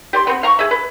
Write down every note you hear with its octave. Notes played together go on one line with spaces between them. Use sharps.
G4 D5 C6
B3 C4
F5 A#5 C#6
G#4 E5
B4